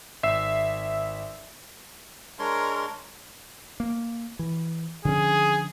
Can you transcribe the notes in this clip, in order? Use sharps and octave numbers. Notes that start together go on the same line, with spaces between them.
G#1 E5 E6 C7 E7
G#3 D4 A#4 C#5 C6
A#3
E3
D3 F3 C#4 G#4